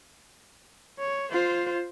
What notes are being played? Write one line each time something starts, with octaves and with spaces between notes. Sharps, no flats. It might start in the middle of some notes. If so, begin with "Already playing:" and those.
C#5
F4 C5